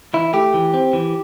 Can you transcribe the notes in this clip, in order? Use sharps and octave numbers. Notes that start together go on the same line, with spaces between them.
E3 E4
A3 G4
E3
C4
E3